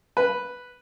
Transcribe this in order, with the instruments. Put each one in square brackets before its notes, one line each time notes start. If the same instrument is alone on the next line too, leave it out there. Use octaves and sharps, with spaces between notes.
[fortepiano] B4